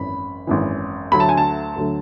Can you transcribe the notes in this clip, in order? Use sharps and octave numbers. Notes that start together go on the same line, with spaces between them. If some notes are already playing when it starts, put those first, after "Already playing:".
Already playing: G#1 F#2 E3 B5
G#1 F#2 E3
D2 D3 F#3 A3 B5
A5
G#5
A5
D2 D3 F#3 A3